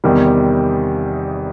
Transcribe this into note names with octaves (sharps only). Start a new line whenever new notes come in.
E2 C3 D#3 G3